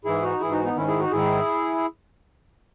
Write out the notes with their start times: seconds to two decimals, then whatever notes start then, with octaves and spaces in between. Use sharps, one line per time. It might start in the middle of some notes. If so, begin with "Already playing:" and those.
0.04 G#2 E3 E4 G#4
0.23 D#4 F#4
0.40 G#2 E3 E4 G#4
0.52 D#4 F#4
0.64 B3 D#4
0.76 G#2 D#3 C#4 E4
0.88 E4 G#4
0.99 D#4 F#4
1.11 G#2 D#3 E4 G#4